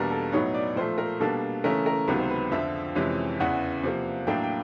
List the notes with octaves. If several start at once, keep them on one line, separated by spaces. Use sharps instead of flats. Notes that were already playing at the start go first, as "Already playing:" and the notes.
Already playing: E2 B2 G3 A#3 D4 A#4
A4
A2 F#3 B3 D#4 C#5
D5
A#2 F3 A3 C5
A#4
B2 G3 A#3 D4 A4
C#3 E3 A3 C#4 A#4
A#4
C#2 C3 D#3 F#3 B3 B4
C5
B4
F2 D3 F3 E5
F2 C3 E3 G#3 C#4
E2 C#3 E3 F#5
C3 F3 A#3
A2 F#3 A#3 D4 G5
G5